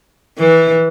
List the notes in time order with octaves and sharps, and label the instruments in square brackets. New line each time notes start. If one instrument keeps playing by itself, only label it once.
[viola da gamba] E3